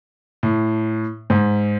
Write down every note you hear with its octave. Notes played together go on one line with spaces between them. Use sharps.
A2
G#2